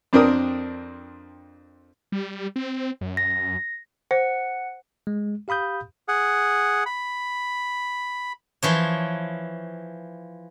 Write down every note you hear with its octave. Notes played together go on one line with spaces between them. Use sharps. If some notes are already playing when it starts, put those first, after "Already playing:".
F2 C4 D4 A#4 D#6
G3
C4
F#2
A#6
C5 F#5
G#3
G4 F5 B5 D#6 G6
G#4 F#5
B5
E3 F3 C#5